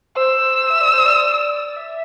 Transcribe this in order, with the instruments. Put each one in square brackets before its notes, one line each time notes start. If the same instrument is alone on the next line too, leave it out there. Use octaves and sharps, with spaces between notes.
[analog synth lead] C5 [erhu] E6
[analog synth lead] E5
D5
C5
D5
E5